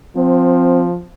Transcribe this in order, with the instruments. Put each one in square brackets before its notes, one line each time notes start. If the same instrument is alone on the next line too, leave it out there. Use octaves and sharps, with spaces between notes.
[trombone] F3 [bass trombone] C4